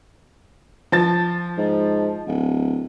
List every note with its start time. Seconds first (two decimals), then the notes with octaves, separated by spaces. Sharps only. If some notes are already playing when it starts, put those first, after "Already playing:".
0.92 F3 A5 A6
1.58 G#2
2.28 D1